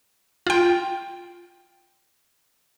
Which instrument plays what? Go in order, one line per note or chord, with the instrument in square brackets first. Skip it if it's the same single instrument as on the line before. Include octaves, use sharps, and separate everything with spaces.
[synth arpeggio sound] F4 G5